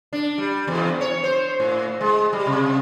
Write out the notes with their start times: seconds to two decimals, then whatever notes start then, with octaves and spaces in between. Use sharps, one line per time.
0.13 D4
0.38 G3
0.68 E2
1.01 C#5
1.24 C5
1.60 A2
2.01 G#3
2.33 G3
2.47 C3